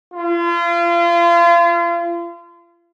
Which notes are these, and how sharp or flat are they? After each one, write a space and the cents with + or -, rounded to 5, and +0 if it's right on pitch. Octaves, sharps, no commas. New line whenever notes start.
F4 -35